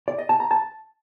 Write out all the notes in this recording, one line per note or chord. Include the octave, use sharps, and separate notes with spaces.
D5
D#5
A5
A#5
A5